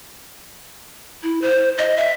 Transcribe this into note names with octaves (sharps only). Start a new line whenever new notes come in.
E4
C5
D#5
E5